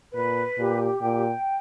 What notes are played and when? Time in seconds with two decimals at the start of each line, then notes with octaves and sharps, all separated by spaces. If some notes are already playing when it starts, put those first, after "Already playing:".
0.14 A#2 B4
0.58 A#2 G4
1.02 A#2 G5